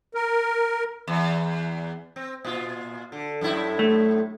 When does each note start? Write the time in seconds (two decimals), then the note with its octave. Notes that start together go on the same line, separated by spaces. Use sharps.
0.15 A#4
1.07 E2
2.16 C4
2.45 A#2 F4
3.12 D3
3.41 F#2 A2 E4
3.79 A3